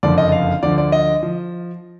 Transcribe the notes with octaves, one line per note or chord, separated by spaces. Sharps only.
F#1 F2 D3 F3 D5
D#5
F5
D2 D3 F3 D5
D5
D#5
F3